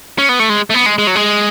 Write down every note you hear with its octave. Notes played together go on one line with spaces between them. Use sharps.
C#4
B3
A3
G#3
A3
B3
G#3
G#3
F#3
G#3